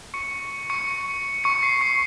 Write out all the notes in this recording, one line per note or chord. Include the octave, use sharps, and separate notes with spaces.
C#6 C#7
C#6 C#7
C#6 C#7
C7
C#6 C#7